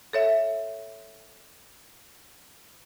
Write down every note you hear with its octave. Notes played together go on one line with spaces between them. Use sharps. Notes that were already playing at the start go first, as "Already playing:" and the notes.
A4 C#5 E5